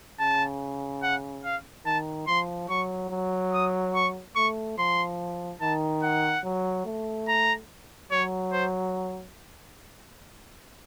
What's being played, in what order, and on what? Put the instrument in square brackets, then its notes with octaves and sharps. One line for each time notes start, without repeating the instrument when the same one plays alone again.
[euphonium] C#3 [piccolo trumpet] A5
[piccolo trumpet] F#5
F5
[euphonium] D#3 [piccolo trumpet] A5
[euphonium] F3 [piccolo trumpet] C6
[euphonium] F#3 [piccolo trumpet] C#6
[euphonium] F#3
[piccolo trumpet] D#6
C#6
[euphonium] A3 [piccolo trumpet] C#6
[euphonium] F3 [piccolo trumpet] C6
[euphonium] D#3 [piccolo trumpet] A5
[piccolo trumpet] F#5
[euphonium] F#3
A3
[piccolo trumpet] A#5
[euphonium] F#3 [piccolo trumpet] C#5
[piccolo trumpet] C5